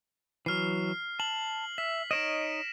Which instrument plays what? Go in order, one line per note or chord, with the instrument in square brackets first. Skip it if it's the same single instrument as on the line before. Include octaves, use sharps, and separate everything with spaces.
[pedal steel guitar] E3 F#3 [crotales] F6 C7
[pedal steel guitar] A5 [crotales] F#7
[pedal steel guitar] E5 [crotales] B6
[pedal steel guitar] D#4 C#5 D#5 [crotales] A#6 D7 E7